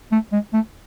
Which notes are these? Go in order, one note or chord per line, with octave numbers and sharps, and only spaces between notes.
A3
G#3
A3